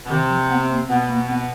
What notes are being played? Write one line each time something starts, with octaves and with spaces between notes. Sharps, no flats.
B2
C3 D#3
F3
B3
A#3
B2 B3
A#3
B3